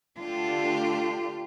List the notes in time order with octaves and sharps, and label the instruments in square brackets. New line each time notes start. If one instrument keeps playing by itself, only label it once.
[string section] D3 A3 D4 G4 [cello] F4